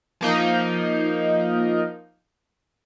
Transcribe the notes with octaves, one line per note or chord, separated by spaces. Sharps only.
F3 A#3 D#4